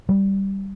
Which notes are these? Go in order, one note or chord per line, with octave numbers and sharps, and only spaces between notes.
G3